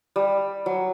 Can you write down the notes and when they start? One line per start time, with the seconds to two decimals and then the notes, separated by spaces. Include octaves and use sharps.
0.16 G3
0.66 F#3